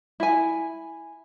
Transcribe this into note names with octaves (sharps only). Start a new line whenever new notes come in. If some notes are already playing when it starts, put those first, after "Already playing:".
E4 G#5